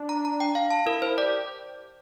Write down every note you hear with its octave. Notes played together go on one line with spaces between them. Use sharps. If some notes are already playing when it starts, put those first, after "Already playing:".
Already playing: D4
A#5
A#5
G5
F5
A5
E4 A#4
C5
G4 D5